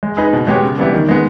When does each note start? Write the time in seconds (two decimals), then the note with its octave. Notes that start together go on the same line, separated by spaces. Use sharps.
0.03 G#3
0.17 D#4 G#4 B4
0.33 B2
0.47 G#3 B3 G4 C#5
0.63 C#3
0.78 E3 G3 B3 E4
0.93 D#3
1.09 G#3 B3